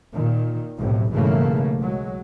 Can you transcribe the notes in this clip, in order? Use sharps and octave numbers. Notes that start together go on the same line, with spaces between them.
A#2 D#3
B1 F2 A2 C3
B1 G#2 C#3 E3 A3 A#3
F#3 G#3